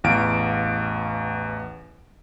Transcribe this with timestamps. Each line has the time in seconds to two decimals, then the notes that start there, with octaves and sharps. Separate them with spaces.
0.04 A1 E2 F5 D7